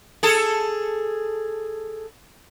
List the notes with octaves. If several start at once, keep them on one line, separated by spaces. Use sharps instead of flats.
G#4 A4